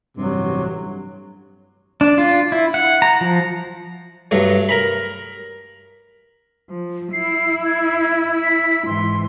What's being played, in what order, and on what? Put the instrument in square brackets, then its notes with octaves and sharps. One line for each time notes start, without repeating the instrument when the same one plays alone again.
[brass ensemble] A1 G2 [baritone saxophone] C3 [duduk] F#3
[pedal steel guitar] D4
F4
E4
F#5
A#5
F3
[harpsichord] G2 F#3 A3
A#4 A#5 B5
[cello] F3
[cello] E4 [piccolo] C7
[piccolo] G#6
B6
[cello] G#2 E3 [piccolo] C6